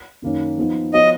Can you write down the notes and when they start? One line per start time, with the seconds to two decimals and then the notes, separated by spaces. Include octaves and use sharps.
0.22 F#2 D#3 A#3 C#4
0.58 F3 B3 D#4
0.93 F3 B3 F#4 C#5 D#5